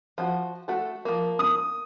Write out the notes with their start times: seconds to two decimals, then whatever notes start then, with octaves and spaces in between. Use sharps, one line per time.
0.18 F3 F#4
0.68 A3 F#4 A4
1.05 F3 A#3
1.39 D#6